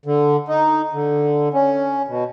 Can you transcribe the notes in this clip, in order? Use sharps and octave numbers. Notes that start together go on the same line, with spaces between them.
D3
D#4
D3
C#4
B2